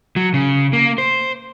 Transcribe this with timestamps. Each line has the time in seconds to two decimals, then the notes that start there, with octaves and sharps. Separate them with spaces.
0.16 F#3
0.34 C#3
0.73 A#3
0.98 C5